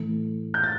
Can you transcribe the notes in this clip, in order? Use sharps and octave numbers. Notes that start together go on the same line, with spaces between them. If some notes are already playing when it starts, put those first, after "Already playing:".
Already playing: A2 E3 A3
G6
A6